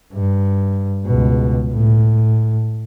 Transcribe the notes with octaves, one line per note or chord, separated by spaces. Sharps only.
G2
C#2 B2
A2